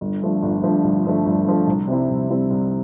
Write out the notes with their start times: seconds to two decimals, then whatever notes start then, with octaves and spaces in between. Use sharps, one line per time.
0.01 G1
0.22 G2 F3 A3
0.42 G1
0.63 G2 F3 A3
0.84 G1
1.05 G2 F3 A3
1.26 G1
1.46 G2 F3 A3
1.67 C2
1.87 C3 G3 C4 E4
2.09 C2
2.29 C3 G3 C4 E4
2.50 C2